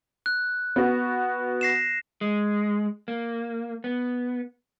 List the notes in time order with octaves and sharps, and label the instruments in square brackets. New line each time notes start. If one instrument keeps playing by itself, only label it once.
[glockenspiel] F#6
[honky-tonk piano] B3 F#4
[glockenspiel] A#6 C7 E7
[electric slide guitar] G#3
A#3
B3